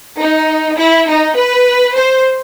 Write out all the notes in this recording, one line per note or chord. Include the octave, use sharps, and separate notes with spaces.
D#4
E4
D#4
B4
C5